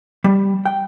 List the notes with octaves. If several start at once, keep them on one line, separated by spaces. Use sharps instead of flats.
G3
G5